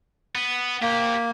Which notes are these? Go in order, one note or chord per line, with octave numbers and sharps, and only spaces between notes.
B3
A#3 G4 C5